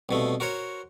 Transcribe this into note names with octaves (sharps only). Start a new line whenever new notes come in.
C2 B2 A3
F#4 A#4 C5 C#5